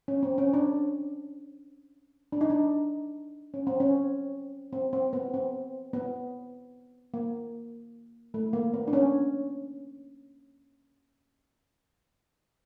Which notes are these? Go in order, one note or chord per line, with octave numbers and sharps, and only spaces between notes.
C#4
C4
C#4
D4
D4
D#4
D4
C#4
C4
C#4
C4
C4
B3
C4
B3
A#3
A3
A#3
B3
D4
C#4